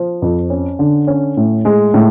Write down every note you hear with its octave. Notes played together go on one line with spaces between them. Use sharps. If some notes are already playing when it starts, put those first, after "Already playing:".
Already playing: F3
F2
C#4
D3
C#4
A2
G#3
A2